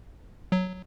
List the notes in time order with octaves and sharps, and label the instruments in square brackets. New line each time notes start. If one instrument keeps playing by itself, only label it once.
[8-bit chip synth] F#3